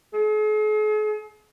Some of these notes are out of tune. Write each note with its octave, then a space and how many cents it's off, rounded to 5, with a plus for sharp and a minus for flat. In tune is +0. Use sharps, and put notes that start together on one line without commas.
G#4 +45